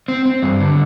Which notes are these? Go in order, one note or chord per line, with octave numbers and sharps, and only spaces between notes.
C4
C4
G2
D3